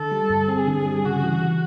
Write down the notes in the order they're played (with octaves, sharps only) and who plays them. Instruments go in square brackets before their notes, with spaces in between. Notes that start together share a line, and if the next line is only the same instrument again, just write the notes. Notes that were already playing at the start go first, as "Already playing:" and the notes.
Already playing: [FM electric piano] D3 [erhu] A4
[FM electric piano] G3
G2
[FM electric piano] C4 [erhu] G#4
[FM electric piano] D3
G3
[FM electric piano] C#3 [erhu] F#4
[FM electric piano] E3